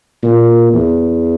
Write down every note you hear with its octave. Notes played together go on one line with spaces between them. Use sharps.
A#2
E2